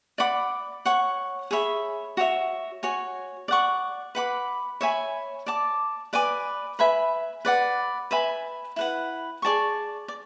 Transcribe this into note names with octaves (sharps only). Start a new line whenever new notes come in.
D5 F#5 B5 D6
C#5 F#5 C#6
G#4 C#5 E5 B5
F#4 C#5 E5
F#4 C#5 G#5
D5 F#5 C#6
B4 F#5 B5 D6
C#5 E5 G#5 B5
D5 A5 D6
B4 D5 G#5 D6
B4 E5 G#5 B5
B4 D5 F#5
B4 E5 G#5 B5
E4 B4 F#5
G#4 D5 A5 C#6
D5